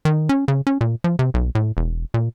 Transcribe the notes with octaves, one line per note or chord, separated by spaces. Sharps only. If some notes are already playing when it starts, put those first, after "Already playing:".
D#3
C#4
C#3
C#4
A#2
F3
C3
B1
A2
E1
A#2